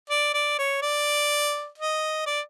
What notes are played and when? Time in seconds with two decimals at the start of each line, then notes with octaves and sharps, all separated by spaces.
0.10 D5
0.34 D5
0.59 C#5
0.82 D5
1.78 D#5
2.26 D5